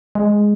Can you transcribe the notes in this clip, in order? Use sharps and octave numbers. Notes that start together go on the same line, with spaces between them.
G#3